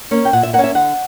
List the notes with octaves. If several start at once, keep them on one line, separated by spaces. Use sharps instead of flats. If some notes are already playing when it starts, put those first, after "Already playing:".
A#3 C#4
G5
A#2 F#5
E5
A#3 F#5
C#4
E5
D3 F#5